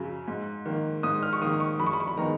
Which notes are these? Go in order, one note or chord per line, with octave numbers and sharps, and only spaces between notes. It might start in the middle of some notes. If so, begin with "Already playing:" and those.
Already playing: F#2 C#3 F#3
G#2
D#3 A#3
G#2 D#6
F6
C#6
D#3 A#3 D#6
C#6
F#2 B5
C#6
B5
C#6
B5
D#3 G#3 B3 A#5